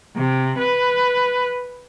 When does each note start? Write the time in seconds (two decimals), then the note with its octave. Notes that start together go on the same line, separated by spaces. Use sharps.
0.16 C3
0.57 B4